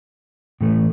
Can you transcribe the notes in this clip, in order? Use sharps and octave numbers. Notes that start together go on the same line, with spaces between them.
A2 E3 A3